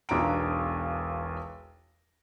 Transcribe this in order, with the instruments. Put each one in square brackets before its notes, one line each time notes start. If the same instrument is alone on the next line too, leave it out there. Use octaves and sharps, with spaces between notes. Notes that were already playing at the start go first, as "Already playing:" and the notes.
[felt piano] E1 B1 D4 A#5 D7